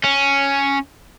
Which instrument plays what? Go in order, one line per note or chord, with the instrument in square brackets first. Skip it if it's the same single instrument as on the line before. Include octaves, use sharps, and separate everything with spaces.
[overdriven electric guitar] C#4